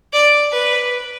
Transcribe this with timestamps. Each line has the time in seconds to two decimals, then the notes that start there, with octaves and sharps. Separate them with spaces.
0.13 D5
0.52 B4